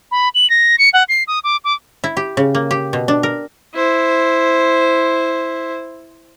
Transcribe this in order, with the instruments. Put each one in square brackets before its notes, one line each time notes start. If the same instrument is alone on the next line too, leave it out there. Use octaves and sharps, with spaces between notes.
[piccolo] B5
F#7
A#6
C#7
F#5
C7
D#6
D6
D6
[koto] E4
G4
C#3
A#3
G4
B2
D4
A#4
[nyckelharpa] E4 C5